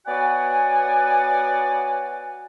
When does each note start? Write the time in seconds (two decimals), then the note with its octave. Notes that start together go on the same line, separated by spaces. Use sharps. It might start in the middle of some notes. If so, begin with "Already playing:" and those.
0.07 B3 F#4 C#5 D5 F#5 G#5